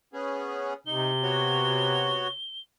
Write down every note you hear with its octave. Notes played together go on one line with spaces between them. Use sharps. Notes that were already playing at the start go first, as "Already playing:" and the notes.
B3 C#4 G#4
C3 D#4 G7
B3 F#4 C#5